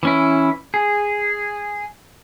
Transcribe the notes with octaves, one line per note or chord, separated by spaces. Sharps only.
E3 C#4 E4
G#4